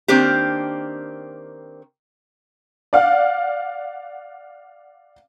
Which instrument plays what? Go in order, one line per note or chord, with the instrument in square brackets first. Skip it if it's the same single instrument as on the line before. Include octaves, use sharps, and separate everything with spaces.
[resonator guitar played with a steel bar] D#3 A#3 C4 D4 G4
[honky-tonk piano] D5 F5 F#5